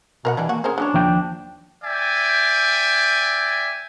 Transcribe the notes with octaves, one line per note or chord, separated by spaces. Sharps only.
B2 A#4 C5 F#5
E3 G3 G#3 D4
A#3 F#4
C#4 G#4 A#4 C5
F#3 C#4 D4 C#5
D#2 F3 G5
D5 E5 G5 G#5